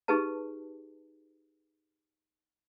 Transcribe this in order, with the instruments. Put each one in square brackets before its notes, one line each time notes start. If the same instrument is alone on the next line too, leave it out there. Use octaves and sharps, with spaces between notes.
[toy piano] D#4 G4 G#4 B4 A5